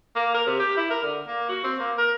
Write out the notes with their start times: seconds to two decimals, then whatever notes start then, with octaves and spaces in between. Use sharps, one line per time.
0.16 A#3
0.34 A#4
0.47 C3
0.60 G4
0.77 E4
0.91 A#4
1.03 D3
1.27 A#3
1.49 F#4
1.64 C4
1.80 A#3
1.98 A#4